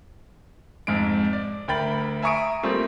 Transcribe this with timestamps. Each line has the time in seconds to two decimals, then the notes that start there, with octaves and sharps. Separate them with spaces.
0.87 F2 G#2 G#3 D7
1.33 D5
1.68 D2 A#4 G5 B5 A6 F#7
2.22 E5 G#5 A#5 C#6 D#6 D7
2.63 G3 A3 A#3 C4 F4